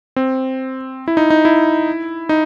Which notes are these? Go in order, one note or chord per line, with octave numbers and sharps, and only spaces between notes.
C4
E4
D#4
D#4
E4
D#4